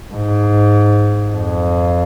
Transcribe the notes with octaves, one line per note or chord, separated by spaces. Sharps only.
G#2
F2